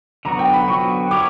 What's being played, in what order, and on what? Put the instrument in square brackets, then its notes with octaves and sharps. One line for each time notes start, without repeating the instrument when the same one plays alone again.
[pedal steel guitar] D3 F#3 B3 F#4 [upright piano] A#5
[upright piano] G5
B5
[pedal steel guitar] D3 F#3 B3 F#4 [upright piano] C#6
[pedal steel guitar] B3 E4 A#4 C#5 [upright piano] D6